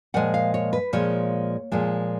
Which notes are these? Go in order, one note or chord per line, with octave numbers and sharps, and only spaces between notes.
A#2 F3 G#3 F#5
F5
C#5
B4
A#2 F3 G#3 C#5
A#2 F3 G#3